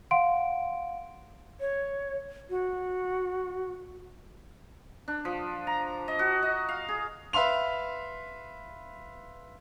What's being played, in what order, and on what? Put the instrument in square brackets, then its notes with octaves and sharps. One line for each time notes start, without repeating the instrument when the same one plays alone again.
[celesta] F5 F#5 C6 D7
[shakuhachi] C#5
F#4
[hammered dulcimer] D4
F3
A#5
D#5
F#4
D#5
F5
G#4
[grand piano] B4 E5 F5 C6 F7